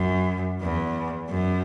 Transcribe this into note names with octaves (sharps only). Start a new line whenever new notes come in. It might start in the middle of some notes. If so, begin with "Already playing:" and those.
Already playing: F#2
E2
F#2